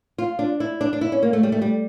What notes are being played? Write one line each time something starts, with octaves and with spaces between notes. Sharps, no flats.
F4
D4
E4
D4
D4
E4
C#4
A#3
A3
G3
A3
G3